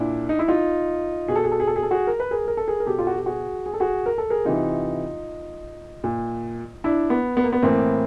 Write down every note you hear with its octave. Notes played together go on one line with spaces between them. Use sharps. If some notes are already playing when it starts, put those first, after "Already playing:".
Already playing: A#2 D4 E4
D#4
E4
D#4 F4
B2 G#4
A4
G#4
A4
G#4
A4
G#4
A4
F#4 G#4
A#4
B4
G#4 A#4
A#4
A4
G#4 A#4
A#4
B2 G4 A4
F4
F#4
G4
F#4 G#4
G#4
A4
F#4 G#4
A#4
A4
G#4 A#4
C3 E3 D#4 F4
A#2
D4 E4
B3
B3
A#3
B3
A2 E3 A#3 C4